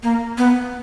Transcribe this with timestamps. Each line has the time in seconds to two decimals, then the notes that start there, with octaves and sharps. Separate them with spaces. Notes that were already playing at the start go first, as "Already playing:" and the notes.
0.03 A#3
0.38 B3